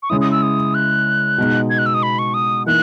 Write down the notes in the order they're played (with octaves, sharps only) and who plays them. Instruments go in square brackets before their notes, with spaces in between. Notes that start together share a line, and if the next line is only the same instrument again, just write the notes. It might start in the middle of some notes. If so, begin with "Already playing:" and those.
[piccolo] C#6
[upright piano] C#3 G#3 C#4 E4 [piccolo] D#6
[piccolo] D#6
E6
D#6
F#6
[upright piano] B2 G#3 D#4
[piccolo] G#6
F#6
E6
D#6
B5
C#6
D#6
[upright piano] E3 A#3 D#4 [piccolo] F#6